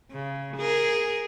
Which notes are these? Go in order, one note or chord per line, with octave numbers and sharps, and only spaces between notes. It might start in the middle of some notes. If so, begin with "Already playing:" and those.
C#3
G#4 A#4